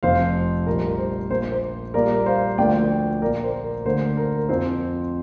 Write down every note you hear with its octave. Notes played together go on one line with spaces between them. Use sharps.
F1 F2 F3 C5 F5
A#1 A#2 G3 A#3 A#4
C5
A#1 A#2 A#3 C5
C5
A#1 A#2 G3 A#3 A#4 D5
C5 F5
D2 D3 F3 A#3 D5 G5
A#1 A#2 A#3 A#4 D5
C5
A#4
D2 D3 A#3 C5
A#4
F2 F3 C4 C5